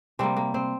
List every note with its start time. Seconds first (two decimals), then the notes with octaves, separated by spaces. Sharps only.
0.19 C3 G3 A#3 C4
0.37 A#3
0.54 C4